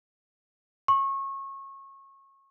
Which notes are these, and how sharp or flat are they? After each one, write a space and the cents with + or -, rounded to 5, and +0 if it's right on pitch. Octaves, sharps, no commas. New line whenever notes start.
C#6 -25